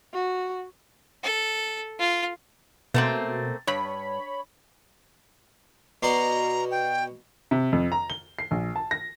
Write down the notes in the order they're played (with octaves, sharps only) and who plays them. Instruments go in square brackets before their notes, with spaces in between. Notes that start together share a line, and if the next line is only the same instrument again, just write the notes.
[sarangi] F#4
[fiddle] A4
F4
[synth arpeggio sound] B2 [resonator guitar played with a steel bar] A3 A#3 C4
[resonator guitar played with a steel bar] G2 [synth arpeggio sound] C#5 B5
[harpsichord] B2 D5 C6 [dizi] A#5
[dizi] G5
[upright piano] C3
F2
A#5
G7
C7
A#1
A5
A#6